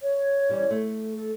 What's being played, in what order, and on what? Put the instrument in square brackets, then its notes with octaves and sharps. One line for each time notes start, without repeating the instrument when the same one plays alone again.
[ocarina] C#5
[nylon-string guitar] E3 G3 C#4
A3
[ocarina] A4